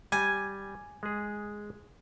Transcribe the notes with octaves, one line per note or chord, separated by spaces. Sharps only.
G3 G#5
G#3 G#4